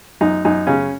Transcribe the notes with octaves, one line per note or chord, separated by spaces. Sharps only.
F#2 D#4
F#2 D#4
C#3 C#4